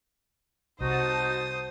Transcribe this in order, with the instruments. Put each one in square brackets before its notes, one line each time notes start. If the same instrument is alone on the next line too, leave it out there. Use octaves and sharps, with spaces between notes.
[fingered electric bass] C2 C3 [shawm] D#4 [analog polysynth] F#4 A5 [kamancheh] C5 D#6